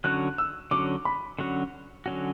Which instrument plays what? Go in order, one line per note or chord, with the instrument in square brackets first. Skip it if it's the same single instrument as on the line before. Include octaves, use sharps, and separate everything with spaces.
[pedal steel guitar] D3 F#3 C#4 F#4 [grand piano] F#6
[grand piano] E6
[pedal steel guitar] D3 F#3 C#4 F#4 [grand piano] D6
[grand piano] B5
[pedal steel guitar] D3 F#3 C#4 F#4
D3 F#3 C#4 F#4